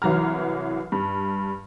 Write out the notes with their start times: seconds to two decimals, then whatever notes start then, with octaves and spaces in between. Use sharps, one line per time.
0.02 C2 E3 F#3 A#5 F6
0.92 G2